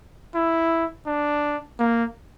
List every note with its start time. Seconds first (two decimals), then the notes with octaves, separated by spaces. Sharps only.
0.35 E4
1.06 D4
1.79 A#3